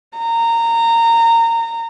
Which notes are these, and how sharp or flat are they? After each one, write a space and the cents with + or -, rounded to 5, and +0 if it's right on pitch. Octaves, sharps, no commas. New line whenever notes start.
A#5 -20